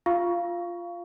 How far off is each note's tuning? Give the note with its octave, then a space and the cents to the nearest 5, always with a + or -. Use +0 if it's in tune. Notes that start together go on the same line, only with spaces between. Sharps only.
F4 +0 F5 -15 C#6 +15